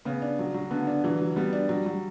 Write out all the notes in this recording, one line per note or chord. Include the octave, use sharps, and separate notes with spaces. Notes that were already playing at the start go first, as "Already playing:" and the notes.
C#3 B3
D4
F#3
F#3
D3 B3
D4
E3 F#3
F#3
G3 B3
D4
F#3
F#3